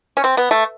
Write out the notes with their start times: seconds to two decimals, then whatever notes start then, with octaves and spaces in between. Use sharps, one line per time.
0.17 C#4
0.24 C4
0.37 B3
0.51 A3